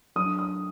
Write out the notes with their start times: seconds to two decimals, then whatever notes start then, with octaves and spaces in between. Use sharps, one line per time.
0.16 F#3 A3 D4 D#6
0.39 D#6